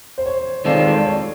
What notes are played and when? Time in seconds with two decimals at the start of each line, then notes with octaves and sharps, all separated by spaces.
0.18 C5
0.26 C#5
0.65 D#3 G#3 C4 F4 A4 D5
0.85 D5
1.05 C#5